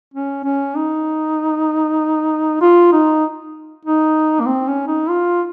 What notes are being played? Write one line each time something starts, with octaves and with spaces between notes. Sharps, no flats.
C#4
C#4
D#4
F4
D#4
D#4
A#3
C4
C#4
D#4
F4